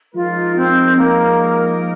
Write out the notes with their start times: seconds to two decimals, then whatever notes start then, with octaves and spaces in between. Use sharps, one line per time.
0.14 F3 G#3 D#4 F4 A#4
0.56 C4
0.98 A#3